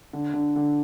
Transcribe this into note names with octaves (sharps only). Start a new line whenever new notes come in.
D3
D3
D3